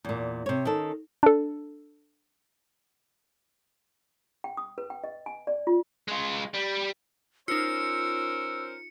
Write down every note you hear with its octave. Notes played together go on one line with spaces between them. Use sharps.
E2 A#2
C3 C#5
D#3 C#4 A4
D4 A4
G5
D#6
B4
G5
D#5
G#5
D5
F4
G#3 F4
G3
C#4 D#4 F4 A#4 C5 E6 C#7